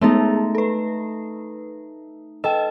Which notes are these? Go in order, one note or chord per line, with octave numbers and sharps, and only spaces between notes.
G#3 A3 B3 D#4 G#4
A4 B4
A4 D#5 G5